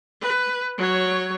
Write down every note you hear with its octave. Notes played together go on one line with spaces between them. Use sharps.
B4
F#3 C#5